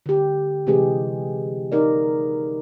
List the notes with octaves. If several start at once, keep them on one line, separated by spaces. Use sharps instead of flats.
D3 G4
C3 E3 G#3 G4 G#4
D#4 A#4 D5